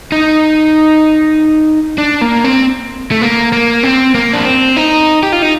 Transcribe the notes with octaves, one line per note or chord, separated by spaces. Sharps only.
D#4
D4
A#3
C4
A3
A#3
A#3
C4
A#3
D4
C4
D#4
G4
F4
D#4